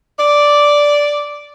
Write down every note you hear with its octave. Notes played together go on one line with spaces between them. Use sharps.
D5